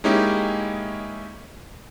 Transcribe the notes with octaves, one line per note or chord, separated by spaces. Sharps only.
G#3 A#3 C#4 D#4 E4 G4